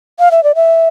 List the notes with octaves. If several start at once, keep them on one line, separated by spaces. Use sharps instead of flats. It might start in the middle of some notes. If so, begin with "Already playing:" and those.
F5
E5
D5
E5